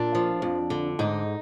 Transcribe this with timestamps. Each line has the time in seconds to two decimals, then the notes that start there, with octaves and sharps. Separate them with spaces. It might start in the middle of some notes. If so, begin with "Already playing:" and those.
Already playing: A#2 D4
0.15 F3
0.42 F2
0.70 D3
0.99 G#2 D#4